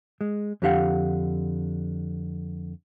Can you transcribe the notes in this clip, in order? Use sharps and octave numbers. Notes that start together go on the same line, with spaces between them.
G#3
F2 D3 G4 F5 F#5